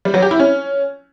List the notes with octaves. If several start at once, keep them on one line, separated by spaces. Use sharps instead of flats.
G3
F#3
G4
E4
C#4